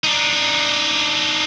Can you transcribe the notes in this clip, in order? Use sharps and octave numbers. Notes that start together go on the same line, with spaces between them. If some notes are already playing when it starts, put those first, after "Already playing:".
D4 D#4